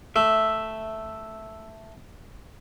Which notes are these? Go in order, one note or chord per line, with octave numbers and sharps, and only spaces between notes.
A3 E5